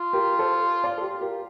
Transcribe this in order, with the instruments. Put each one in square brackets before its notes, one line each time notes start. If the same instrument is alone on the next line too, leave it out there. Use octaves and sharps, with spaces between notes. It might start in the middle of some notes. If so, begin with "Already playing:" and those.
Already playing: [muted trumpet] F4
[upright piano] G4 A#4
A4 C5
D5 F5
A4
G4
G4 A#4